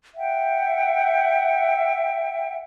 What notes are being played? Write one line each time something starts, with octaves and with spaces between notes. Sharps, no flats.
E5 F#5 G5